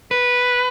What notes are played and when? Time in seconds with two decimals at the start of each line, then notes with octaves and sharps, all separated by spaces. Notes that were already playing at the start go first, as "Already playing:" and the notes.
0.11 B4